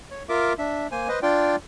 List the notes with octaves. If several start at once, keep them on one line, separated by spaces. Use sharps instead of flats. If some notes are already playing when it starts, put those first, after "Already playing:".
C#5
F4 A#4 E5 D6
D4 E5
A#3 C5 G#5
B4 C5 D#5
D4 F4 D5 G5